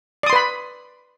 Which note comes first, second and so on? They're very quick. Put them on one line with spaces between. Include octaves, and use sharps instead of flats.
D5 D#6 C6 B4 B5